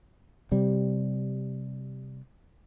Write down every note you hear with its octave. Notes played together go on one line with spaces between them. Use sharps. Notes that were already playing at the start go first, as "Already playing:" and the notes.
C3 G3